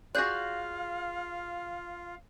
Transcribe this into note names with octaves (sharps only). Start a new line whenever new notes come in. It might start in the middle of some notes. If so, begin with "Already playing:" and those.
F4 F#4 G#4 D5 F5 F#6 G6